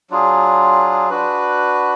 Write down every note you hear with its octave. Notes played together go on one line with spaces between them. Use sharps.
F#3 D4 F4 G#4
D4 F#4 B4